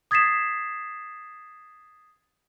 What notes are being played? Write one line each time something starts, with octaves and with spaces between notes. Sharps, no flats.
D#6 G#6 A6 B6 C7 E7